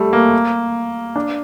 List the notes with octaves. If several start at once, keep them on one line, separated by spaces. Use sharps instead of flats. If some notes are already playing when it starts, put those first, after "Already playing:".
Already playing: G3 A3
A#3
D4